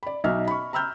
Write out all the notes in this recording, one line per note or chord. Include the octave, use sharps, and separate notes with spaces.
D5 B5
B1 D#4 E5 F6
B5 C#6
A#5 B5 E6 F6 G6